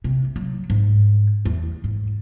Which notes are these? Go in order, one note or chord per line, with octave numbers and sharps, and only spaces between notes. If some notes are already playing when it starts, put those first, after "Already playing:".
C3
F#3
G#2
E2
G#2